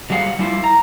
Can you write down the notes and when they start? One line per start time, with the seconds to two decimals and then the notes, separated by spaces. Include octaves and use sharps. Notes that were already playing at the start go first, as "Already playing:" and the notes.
0.10 F#3 G3 G#4 F5 F#5
0.39 G3 E4 F4
0.64 A#5